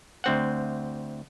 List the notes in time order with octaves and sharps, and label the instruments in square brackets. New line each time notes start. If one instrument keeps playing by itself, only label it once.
[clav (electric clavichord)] D2 C4 F#5